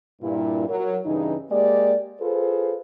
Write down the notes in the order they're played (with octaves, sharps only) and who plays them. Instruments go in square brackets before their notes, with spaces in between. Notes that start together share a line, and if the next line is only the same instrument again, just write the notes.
[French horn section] G2 A#2 E4
F#3 A#4
G2 C#3 E3 D#4
G#3 A#3 G4 D5
F4 G#4 A4 B4 C5